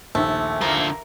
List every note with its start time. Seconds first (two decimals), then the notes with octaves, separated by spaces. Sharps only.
0.15 A#1 D#2 A3
0.61 D3 F3 A#3